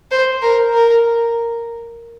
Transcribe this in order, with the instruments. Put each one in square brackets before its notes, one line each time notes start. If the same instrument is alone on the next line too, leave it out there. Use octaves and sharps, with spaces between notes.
[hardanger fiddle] C5
A#4
A#4